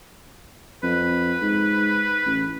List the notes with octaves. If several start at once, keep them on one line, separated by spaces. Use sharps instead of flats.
F2 B4
G#2
A1